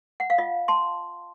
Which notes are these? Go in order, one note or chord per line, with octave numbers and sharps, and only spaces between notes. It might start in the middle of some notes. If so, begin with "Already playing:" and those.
F#5
F5
F4 D#5
A5 C6